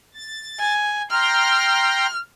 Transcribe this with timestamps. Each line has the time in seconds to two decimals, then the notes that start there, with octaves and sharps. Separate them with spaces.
0.15 A6
0.59 G#5
1.11 G5 A#5 C6 F6